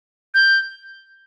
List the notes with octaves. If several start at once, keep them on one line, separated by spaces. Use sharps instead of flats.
G6